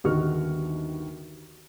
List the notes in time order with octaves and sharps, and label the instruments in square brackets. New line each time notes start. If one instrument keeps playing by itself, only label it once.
[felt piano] G1 D#2 D#3 F#4 C#6 F6